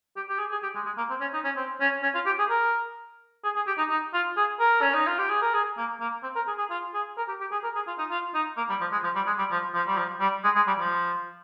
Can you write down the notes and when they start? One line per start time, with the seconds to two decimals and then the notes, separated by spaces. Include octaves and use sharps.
0.16 G4
0.29 G4
0.39 G#4
0.51 G#4
0.62 G4
0.75 G#3
0.85 G#3
0.97 A#3
1.10 C4
1.21 C#4
1.33 D#4
1.44 C#4
1.56 C4
1.80 C#4
2.03 C#4
2.14 F4
2.26 G4
2.38 G#4
2.50 A#4
3.44 G#4
3.55 G#4
3.67 G4
3.78 D#4
3.90 D#4
4.14 F4
4.37 G#4
4.60 A#4
4.82 C#4
4.94 D#4
5.07 F4
5.18 G4
5.30 G#4
5.42 A#4
5.54 G#4
5.77 A#3
6.00 A#3
6.23 C4
6.35 A#4
6.47 G#4
6.58 G#4
6.70 F4
6.94 G#4
7.17 A#4
7.28 G4
7.40 G4
7.51 G#4
7.63 A#4
7.75 G#4
7.87 F4
7.98 D#4
8.10 F4
8.34 D#4
8.57 A#3
8.69 G3
8.81 F3
8.92 G#3
9.04 F3
9.15 G3
9.27 G#3
9.38 G3
9.51 F3
9.74 F3
9.87 G3
9.97 F3
10.20 G3
10.44 G#3
10.56 G#3
10.67 G3
10.79 F3